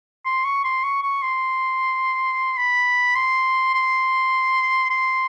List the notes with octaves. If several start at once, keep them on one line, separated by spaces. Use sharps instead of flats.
C6
C#6
C6
C#6
C#6
C6
B5
C6
C6
C6